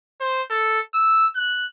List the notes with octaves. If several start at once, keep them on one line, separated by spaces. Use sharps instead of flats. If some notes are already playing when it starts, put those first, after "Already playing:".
C5
A4
E6
F#6